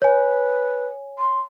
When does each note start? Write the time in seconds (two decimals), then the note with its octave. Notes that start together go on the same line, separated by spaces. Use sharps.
0.02 B4 C#5 G#5
1.19 C6